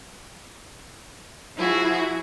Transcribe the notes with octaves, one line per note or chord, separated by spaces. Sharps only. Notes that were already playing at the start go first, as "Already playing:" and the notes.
F3 E4 F#4 G#4